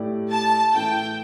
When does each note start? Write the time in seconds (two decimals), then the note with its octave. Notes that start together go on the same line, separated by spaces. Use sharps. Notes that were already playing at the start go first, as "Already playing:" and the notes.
Already playing: A2 A3 E4 G4 D5
0.30 A5
0.73 A2 E3 A3 G5